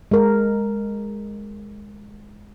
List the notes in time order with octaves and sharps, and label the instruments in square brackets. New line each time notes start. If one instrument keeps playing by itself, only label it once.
[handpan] G#3 A#4